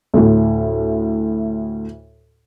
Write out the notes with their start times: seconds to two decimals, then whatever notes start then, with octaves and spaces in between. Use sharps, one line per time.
0.14 D2 A2